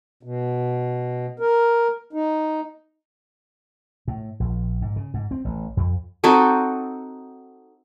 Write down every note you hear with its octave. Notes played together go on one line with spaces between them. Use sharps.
B2
A#4
D#4
A2
A#1
G#2
C#3
G#2
C4
A1
F2
C4 D#4 F#4 A4